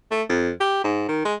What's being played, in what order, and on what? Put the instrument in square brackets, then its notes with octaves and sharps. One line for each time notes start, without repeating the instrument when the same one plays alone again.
[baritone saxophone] A3
F2
G4
G#2
D#3
G#3